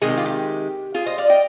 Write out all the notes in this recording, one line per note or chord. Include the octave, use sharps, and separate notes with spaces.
C3 D#3 G#3 G#4
G4
F4
G4
F4 G#4
C5 D#5
D5 F5
D#5 G5